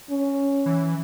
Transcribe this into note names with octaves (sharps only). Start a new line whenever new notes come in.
C#4
E3